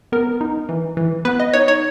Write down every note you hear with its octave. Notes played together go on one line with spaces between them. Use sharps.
B3 A#4
D#4
E3
E3
B3 B4
D#5
D#4 C#5
C#5